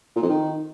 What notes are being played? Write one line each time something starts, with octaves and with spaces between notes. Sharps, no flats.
A#2
F2
D#3